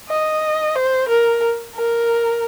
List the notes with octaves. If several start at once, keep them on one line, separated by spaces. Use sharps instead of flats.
D#5
C5
A#4
A#4